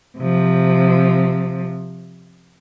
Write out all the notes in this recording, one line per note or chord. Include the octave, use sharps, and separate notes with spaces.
C3 F3